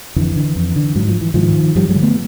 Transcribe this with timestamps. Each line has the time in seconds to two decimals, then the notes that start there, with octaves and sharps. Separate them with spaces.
0.16 F2 D3 E3
0.36 D3
0.56 F2
0.76 D3
0.96 G#2 F#3
1.08 F3
1.21 E3
1.34 G#2 D#3 F3
1.76 G2 F3 G3
1.89 F#3 G#3
1.96 D3
2.02 A3 B3